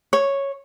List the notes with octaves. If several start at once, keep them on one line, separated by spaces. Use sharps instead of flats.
C#5